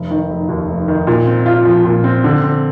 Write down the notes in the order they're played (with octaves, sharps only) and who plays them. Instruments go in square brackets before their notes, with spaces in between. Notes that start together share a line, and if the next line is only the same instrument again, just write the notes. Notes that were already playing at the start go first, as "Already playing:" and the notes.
Already playing: [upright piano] F1
D#3
F1
D#2
F1
D#3
A#2
C4
F4
F3
A#2
C4
D3
C4